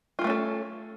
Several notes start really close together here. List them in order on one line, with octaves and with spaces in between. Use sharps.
F4 G#3 A3 C#4 A4